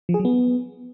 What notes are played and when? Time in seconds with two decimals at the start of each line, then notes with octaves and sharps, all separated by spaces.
0.09 F3
0.14 G#4
0.20 F#3
0.25 B3